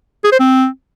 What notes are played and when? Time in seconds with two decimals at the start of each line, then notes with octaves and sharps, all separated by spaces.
0.24 G#4
0.32 C5
0.40 C4